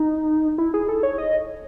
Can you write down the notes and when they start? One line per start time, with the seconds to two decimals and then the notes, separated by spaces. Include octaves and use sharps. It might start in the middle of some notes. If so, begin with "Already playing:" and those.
Already playing: D#4
0.58 E4
0.74 G#4
0.89 A4
1.03 C#5
1.18 D#5